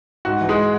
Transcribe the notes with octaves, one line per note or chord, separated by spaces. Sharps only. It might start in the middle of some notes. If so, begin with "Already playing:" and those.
G#2 F#4
E3
G#3 G#4